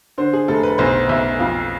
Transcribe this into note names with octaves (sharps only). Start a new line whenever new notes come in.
D3 C5
G#4
F1 A4
B4
B1 C5
B1 E5
F2 F5